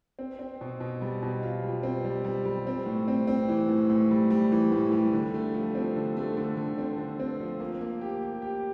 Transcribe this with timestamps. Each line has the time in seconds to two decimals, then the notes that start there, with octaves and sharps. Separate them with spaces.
0.19 C4
0.39 C4
0.61 B2
0.80 B2
1.02 G3
1.23 B2
1.43 F4
1.63 G3
1.83 C4
2.05 G3
2.24 G3
2.45 G3
2.67 C4
2.86 A2
3.08 C4
3.27 C4
3.49 E3
3.69 A2
3.90 A2
4.11 G3
4.30 G3
4.52 E3
4.72 A2
4.92 G3
5.13 D3
5.34 A3
5.54 F3
5.75 C4
5.96 D3
6.17 A3
6.37 D3
6.57 D3
6.78 C4
6.98 D3
7.20 C4
7.40 F3
7.60 A#3
7.81 A#3
8.01 G4
8.23 G4
8.42 G4